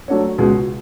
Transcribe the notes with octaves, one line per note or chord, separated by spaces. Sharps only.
F#3 A3 D4 F#4 C#5
C#2 B2 G#3